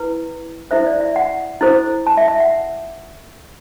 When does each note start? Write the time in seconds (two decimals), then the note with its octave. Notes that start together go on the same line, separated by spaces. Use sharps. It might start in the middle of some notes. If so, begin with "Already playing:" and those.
Already playing: E4 B4
0.71 E4 A4 C5 E5
0.86 D5
1.01 E5
1.16 F#5
1.61 E4 A4 C5
2.07 A5
2.17 E5
2.28 E5
2.40 F#5